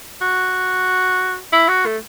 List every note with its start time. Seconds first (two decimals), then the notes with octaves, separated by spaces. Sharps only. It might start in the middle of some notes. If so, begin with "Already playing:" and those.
0.21 F#4
1.52 E4
1.68 F#4
1.85 A3